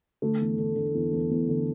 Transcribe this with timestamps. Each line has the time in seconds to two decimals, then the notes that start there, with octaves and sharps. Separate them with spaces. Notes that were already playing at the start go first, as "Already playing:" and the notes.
0.22 D3 A3
0.41 E2
0.58 D3
0.76 D3
0.95 E2
1.13 E2
1.31 E2
1.49 D3